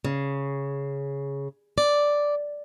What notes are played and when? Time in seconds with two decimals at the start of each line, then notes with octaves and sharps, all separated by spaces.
0.05 C#3
1.78 D5